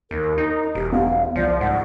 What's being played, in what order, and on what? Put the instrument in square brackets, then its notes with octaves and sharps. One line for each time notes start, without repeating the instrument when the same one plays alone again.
[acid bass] D#2 [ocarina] A#4
[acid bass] D#4
[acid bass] E1 [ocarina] G4
[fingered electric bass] B3 [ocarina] F5
[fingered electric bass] C2 [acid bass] F3 [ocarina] D5
[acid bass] G#2 [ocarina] F#5